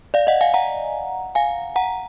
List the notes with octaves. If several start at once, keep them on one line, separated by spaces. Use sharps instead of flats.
D5 F5
D#5 F#5
F5 G#5
F#5 A#5
F5 G#5
F#5 A#5